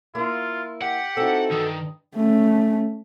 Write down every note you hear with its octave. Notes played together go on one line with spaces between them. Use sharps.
A#3 E4 F4
G4 F#5
C4 D#4 E4 F#4 A4
G2 D#3 D#5
A3 C#4